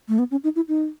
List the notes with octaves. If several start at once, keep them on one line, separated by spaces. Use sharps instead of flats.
A3
B3
C#4
D#4
E4
D#4